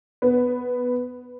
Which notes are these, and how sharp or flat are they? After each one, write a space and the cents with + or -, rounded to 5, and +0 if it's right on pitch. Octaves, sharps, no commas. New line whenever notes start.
B3 +5